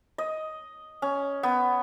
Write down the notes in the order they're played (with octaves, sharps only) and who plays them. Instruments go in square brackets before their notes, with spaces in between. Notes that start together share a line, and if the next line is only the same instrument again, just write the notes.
[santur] D#5
C#4
B3